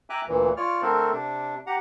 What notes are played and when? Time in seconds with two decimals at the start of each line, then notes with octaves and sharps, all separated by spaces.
0.10 E5 G5 G#5 A#5 D6 F#6
0.28 D2 A#2 E3
0.57 F4 C#5 D5 F6
0.82 D3 A3 C4 A4 A#4 C5
1.13 C3 D4
1.67 G4 F#5 A#5